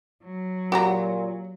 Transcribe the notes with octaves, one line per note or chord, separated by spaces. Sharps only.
F#3
A#2 F#4 G4 A#5